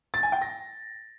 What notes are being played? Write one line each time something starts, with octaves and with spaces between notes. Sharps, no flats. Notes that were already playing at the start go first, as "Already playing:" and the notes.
A6
G#5
G5
A#6